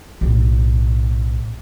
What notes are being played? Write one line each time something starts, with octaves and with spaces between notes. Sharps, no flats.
B1 A2